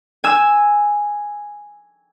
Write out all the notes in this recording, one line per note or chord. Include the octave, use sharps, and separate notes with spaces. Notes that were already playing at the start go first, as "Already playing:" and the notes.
G#5 E6